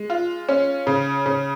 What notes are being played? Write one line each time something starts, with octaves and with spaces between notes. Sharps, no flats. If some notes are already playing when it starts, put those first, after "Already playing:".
Already playing: G#3
F4
C#4
C#3
C#3